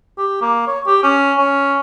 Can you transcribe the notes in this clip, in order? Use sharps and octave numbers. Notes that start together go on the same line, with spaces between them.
G4
A#3
C#5
G4
C#4
C#4